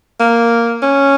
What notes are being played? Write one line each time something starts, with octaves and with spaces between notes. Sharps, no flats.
A#3
C#4